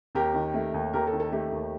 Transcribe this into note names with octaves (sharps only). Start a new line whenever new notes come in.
D#2 G4 A#4
D#3
A3
D#2
D#2 G4 A#4
A4
D#3
A4
A3 G4
D#2